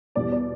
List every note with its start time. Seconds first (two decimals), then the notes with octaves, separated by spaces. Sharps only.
0.15 E2 B2 G3 D5
0.32 D5